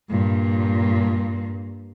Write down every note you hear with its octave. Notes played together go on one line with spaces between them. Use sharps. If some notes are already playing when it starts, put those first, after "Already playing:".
G2 A#2